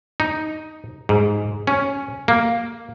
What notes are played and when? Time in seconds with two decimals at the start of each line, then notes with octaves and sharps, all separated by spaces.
0.20 D#4
1.09 G#2
1.67 C#4
2.28 A#3